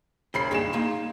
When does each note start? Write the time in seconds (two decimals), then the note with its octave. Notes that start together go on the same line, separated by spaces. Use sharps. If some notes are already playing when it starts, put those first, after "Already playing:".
0.34 E1 C5 B5 C6 C7
0.51 G2 A#2 D#3 G#4 E7
0.73 A#3 D#4 C6